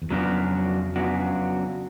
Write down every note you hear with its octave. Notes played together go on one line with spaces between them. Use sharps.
E2
F2 C#3 F#3 B3 D4 F#4
C#3 F#3 B3 D4 F#4